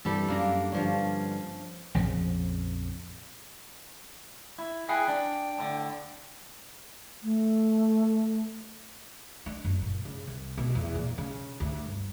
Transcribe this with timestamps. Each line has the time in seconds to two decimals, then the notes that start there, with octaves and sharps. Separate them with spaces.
0.05 G2 C3 E3 G3 A4
0.28 F#2 A#3 D4 A#5
0.72 G2 D3 F3 C#4
1.94 A#1 F2 C#3 F3
4.59 E4
4.89 E4 G#4 F#5 G5
5.08 D4
5.58 A2 D3
7.23 A3
9.46 D4
9.64 F#1
9.82 A#2
10.05 C#3
10.27 C2
10.58 B2
10.75 E2
10.95 A#2
11.18 C#3
11.60 D2
11.85 G1